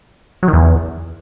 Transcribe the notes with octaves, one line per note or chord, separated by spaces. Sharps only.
F#3
D#3
E2